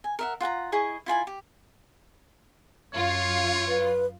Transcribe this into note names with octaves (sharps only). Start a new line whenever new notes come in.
G#5
A#4 E5 F#5
F4 F#5 G#5 A#5
E4 G#4 D#5 C#6
E4 F4 G#5 B5
G4
F#2 F4 C#5
B4